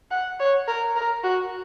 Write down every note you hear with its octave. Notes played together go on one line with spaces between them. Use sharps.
F#5
C#5
A#4
A#4
F#4